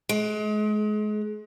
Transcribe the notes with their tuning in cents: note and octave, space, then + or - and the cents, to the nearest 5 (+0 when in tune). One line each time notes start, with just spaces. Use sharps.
G#3 +35